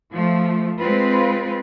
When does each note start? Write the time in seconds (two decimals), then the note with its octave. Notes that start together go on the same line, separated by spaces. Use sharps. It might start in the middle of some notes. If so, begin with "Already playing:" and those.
0.12 F3 A3
0.78 G#3 C4 F4 B4